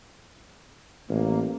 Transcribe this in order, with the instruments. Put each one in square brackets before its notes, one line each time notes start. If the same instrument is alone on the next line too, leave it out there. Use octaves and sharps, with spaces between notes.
[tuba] A1 [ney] A#3